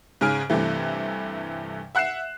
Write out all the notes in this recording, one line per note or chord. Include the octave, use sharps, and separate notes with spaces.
G#2 C#3 G#5 F6 D7
G2 C3 E3 A3
E5 F#5 F#6 C7 E7